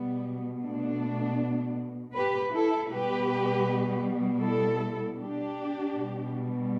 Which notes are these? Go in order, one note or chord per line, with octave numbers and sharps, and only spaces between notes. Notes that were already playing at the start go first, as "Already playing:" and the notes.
Already playing: B2 G3 B3
A3 D4
G4 B4
E4 A4
B2 G3 G4 B4
E4 A4
D4 G4
B2 G3